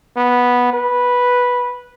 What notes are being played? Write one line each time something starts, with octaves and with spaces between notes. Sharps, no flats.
B3
B4